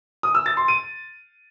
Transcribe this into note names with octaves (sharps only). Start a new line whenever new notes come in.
D#6
E6
A6
C6
D#7